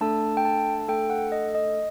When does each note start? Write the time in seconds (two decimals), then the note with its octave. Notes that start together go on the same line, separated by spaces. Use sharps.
0.01 A3 D4 A4 A5
0.37 G5
0.45 A5
0.88 A3 D4 A4 G5
1.10 F#5
1.32 D#5
1.55 D#5